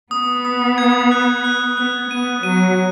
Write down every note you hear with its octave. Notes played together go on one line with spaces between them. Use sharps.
B3 D#6
D#6
G#6
F#6
F#6
B3 F#6
B3 D#7
F#3 D#7